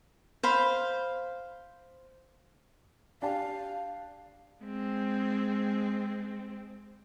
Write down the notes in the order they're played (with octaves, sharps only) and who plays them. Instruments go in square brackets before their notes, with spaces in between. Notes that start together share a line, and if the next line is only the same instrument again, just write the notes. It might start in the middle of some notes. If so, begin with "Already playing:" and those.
[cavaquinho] C5 F5 B5
[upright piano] D4 G4 A5 [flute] F5
[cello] G#3 C4